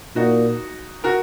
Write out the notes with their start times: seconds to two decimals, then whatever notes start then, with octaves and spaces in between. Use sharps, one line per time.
0.16 A#2 D#4 F#4
1.04 F#4 A#4